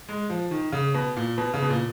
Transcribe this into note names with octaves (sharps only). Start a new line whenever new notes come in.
G#3
F3
D#3
C#3
B2
A#2
B2
C#3
B2
A#2